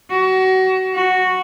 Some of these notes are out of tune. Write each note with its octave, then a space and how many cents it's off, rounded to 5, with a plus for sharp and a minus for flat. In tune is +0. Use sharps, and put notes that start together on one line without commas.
F#4 +25
F#4 -5